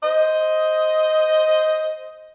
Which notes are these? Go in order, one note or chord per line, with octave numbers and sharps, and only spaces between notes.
C5 D#5